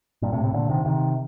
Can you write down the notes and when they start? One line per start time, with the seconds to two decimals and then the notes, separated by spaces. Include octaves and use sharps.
0.22 G2 A#2
0.32 A2 C3
0.44 A2 C3
0.53 A#2 D3
0.69 C3 D#3
0.85 C3 D#3